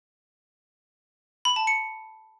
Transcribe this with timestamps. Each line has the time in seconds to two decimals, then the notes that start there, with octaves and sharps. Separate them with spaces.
1.45 B5
1.56 A5
1.67 C#7